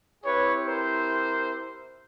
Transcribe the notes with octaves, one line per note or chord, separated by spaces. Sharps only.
C4 E4 G4 B4 C#5
A#4 C5